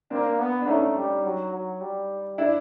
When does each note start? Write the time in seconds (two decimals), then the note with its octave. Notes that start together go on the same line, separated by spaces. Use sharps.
0.10 A#3 C4 D4
0.39 B3
0.62 D4
0.67 A3 C#4 D#4
0.96 G3
1.24 F#3
1.53 F#3
1.81 G3
2.38 D4 E4